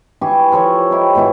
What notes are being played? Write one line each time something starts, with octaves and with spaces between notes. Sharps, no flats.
E3 G4 G#4 C#6
F3 A4 C#5
D#4 E4 G4
G#2 B2 E3 E4